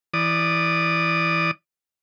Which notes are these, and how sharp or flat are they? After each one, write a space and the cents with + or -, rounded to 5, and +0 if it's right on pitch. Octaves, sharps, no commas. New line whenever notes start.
E3 +0 D5 +0 D#6 -20